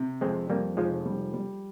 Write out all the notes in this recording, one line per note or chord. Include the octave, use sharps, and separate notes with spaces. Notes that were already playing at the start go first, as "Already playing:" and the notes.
Already playing: C3
F2 G#3 C4
F2 G3 A#3
F1 F3 G#3
G3
G3